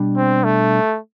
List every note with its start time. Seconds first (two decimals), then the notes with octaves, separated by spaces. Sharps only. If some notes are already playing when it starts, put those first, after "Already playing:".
Already playing: B2 G3 D4
0.16 C4
0.44 A3